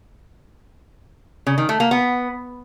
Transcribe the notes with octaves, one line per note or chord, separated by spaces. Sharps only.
C#3
D#3
A3
A#3
B3